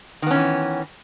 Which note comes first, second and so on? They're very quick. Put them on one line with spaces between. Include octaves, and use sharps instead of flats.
D#3 B3 C#4 E3